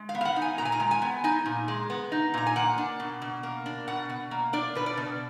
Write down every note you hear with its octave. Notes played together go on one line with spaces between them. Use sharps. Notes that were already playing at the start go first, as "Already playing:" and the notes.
Already playing: G#3
F5
B3
F5
F#5
D#4
G#5
A#2 A#5
G#5
A#5
G#3
G#5
B3
D#4 G#5
A#2
G#3
B3
D#4
A#2 A#5
G#5
A#3 F#5
D4
B2
B2
A#3
D4
B2 F#5
B2
A#3
D4 D5
B2 B4
D5
B2